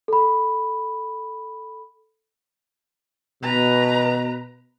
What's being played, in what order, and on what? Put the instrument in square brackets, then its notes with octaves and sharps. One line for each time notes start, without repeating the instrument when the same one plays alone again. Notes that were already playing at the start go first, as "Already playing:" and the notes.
[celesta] A4 B5
[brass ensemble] B2 [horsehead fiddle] B4 A#5